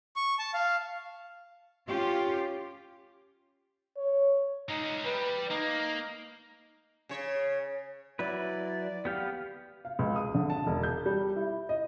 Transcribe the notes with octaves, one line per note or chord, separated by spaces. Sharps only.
C#6
A5
F5
C#4 F4 G4
C#5
G#3 C#4 D#4
G3 B4
A#3 D#4
C#3 C#5
F#3 E4 B4 D5
B3 G4 F5
F5
C#2
D#6
D3
A5
E1
G6
G3
E4
D#5